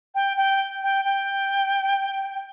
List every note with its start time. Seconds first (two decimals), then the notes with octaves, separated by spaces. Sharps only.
0.15 G5
0.37 G5
0.82 G5
1.05 G5